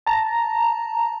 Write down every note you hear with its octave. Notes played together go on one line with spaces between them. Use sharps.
A5 A#5